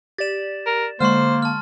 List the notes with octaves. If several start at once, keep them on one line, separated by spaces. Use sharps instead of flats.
G4 D5 A6 E7
A#4
D3 G#3 A#3 C5 C6 C#6 F6
A5 F6